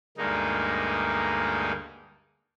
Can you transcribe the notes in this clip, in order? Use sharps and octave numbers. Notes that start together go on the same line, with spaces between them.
D2 G2 G#3 A#3 D#4